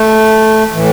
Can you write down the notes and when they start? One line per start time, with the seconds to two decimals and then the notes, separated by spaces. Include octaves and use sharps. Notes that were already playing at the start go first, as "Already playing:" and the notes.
Already playing: A3
0.73 A2 E3